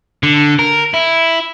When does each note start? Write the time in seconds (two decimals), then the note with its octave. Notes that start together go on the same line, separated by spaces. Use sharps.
0.23 D3
0.59 A#4
0.94 E4